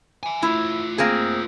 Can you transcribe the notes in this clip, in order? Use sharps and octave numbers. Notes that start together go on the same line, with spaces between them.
E5 G#5
A3 E4 F4
A#3 C4 G#4